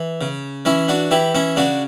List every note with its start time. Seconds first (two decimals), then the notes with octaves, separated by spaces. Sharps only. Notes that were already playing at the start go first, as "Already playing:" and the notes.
Already playing: E3
0.21 C#3
0.65 E3 C#4 E4
0.88 D4 F#4
1.11 E3 E4 G4
1.35 C#4 E4
1.56 C#3 D4 F#4